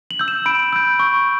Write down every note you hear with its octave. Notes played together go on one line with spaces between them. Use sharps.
F#7
E6 G6
E7
B5 D7
E6 G6
C#6